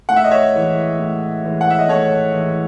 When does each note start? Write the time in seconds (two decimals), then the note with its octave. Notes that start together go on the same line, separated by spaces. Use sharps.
0.09 A2 F#5
0.16 E5
0.24 D#5
0.31 C#5 E5
0.54 E3 G#3
0.99 A2
1.44 E3 G#3
1.61 F#5
1.70 E5
1.79 D#5
1.88 A2 A4 C#5
2.33 E3 G#3